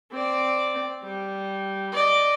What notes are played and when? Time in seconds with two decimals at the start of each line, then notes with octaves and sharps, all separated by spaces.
0.12 C4 D5
1.04 G3
1.93 D5 D#5